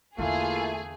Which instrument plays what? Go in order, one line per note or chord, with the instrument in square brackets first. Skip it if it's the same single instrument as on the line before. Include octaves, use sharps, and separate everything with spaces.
[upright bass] E2 D3 [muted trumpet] A3 [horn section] A#3 E4 F4 [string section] G#4